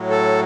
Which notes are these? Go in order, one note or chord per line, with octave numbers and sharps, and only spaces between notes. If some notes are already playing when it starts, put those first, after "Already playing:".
Already playing: A2 F#3
A4